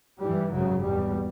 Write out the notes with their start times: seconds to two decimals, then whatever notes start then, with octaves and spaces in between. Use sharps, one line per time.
0.20 G2 E3 G3
0.52 G#1 F#2 C#3 F#3
0.83 E2 B2 G3